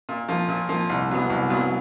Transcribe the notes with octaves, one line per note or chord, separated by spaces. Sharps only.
A#2
F3 A#3
A#2
F3 A#3
C2
A#2 F#3 B3
C2
A#2 F#3 B3